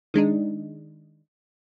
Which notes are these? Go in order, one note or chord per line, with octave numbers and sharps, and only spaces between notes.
D#3 G#3 D4 D#4